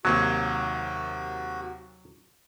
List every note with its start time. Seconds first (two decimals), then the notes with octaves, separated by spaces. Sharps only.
0.05 D#2 C3 F#3 A#3 F#4